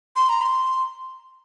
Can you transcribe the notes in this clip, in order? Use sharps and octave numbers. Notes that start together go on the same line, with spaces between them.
C6
A#5
C6